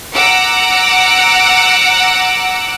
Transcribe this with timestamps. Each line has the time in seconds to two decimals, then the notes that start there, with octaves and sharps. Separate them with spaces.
0.13 F#5 A#5 D6 E6